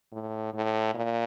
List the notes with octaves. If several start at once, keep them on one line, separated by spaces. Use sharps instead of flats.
A2
A2
A#2